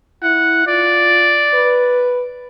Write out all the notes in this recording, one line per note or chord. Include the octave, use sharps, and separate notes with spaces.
E4 F#5
F4 D5
B4